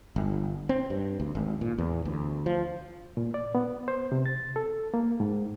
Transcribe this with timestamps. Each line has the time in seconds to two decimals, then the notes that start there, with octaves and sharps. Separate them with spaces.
0.16 G1
0.69 C4
0.90 G2
1.20 D2
1.35 G#1
1.61 A#2
1.78 E2
2.05 D2
2.46 F3
3.17 A#2
3.34 D5
3.55 B3
3.88 C5
4.12 C3
4.26 A6
4.56 A4
4.94 A#3
5.20 G#2